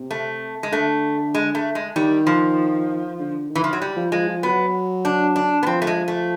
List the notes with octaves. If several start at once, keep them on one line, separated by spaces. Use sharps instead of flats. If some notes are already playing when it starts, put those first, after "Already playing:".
Already playing: C3
A3
G#3
D3 A3
G#3
A3
G#3
D#3 G3
F3
D3
D#3
E3
F3
F#3
G3
F3
F3 G#3
F3
F#3 B3
D4
D4
B3
F3 C4
A3
G#3
A3